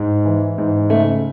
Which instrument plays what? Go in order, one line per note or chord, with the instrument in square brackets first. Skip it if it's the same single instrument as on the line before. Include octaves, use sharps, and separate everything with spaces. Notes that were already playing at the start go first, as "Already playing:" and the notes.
Already playing: [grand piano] G#2
E3
G#2
C#3 A3